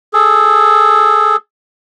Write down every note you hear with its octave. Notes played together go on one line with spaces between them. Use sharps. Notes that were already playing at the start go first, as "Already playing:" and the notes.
G#4 A4